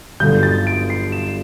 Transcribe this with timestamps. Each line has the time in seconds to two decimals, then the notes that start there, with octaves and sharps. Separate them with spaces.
0.20 G1 G2 D3 F#3 G6
0.43 A6
0.67 D7
0.90 C7
1.12 E7